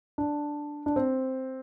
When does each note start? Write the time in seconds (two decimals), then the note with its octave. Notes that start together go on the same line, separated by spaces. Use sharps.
0.18 D4
0.86 D4
0.96 C4